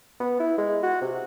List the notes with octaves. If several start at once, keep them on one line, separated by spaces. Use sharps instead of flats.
B3
E4
G#3
F#4
C3